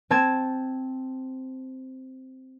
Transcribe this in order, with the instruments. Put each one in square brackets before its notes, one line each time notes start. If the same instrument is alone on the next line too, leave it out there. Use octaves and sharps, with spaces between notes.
[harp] C4 A5 G#6 E7